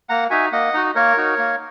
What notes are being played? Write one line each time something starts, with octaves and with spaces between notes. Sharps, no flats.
A#3 F#5 A#5
D#4 F#4 E5 G#5
A#3 D#5 F#5
D#4 F#4
A#3 A#4 C#5
D#4 F#4
A#3